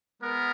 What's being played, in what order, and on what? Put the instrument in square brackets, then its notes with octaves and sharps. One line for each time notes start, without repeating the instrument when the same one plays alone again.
[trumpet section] G#3 B3 A#4